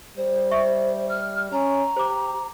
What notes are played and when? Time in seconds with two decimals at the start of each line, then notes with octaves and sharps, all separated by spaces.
0.17 G3 C5
0.51 E5 C#6
1.09 F6
1.52 C#4 A#5
1.97 G4 C5 D6